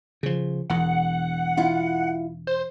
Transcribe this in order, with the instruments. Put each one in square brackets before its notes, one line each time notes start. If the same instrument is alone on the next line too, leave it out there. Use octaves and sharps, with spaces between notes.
[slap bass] C#3 F3
[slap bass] E1 E2 [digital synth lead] F#5
[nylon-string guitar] E4 F4
[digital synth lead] C5